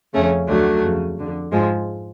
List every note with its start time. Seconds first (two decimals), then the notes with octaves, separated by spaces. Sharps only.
0.13 F2 C#3 A3 C#4
0.48 D2 D3 F#3 A3
0.83 F2 C#3
1.18 F2 D3
1.52 G#2 F3 G#3